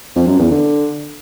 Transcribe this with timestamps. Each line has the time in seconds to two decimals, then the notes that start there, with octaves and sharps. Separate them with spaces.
0.16 F2
0.27 F#2
0.39 E2
0.51 D3